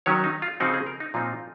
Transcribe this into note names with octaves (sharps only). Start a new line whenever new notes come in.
D#3 F#3 C#4 C#5
D#4
F4
C#3 F3 C4 D#4 F#4
G#4
A#4
D#4
A#2 F3 C4 D#4 F4